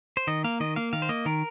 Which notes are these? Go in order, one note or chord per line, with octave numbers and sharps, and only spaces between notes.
C5
D#3 D#5
A#3 F5
D#3 D#5
A#3 F5
D#3 F5
C5
A#3 D#5
D#3 A#4